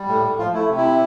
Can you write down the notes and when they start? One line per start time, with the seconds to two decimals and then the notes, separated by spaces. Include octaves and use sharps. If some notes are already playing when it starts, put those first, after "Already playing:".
Already playing: G3
0.08 A2
0.24 A2
0.38 F3 F4
0.54 A3 E4
0.69 C3
0.78 E4